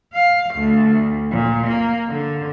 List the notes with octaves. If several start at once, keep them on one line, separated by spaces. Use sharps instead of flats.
F5
D2
A#2
A#3
D3